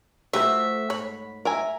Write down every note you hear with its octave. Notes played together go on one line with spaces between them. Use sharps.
F3 A3 F#4 G4 B4 C5 E5
G#2 C#5 B5
A#4 E5 G#5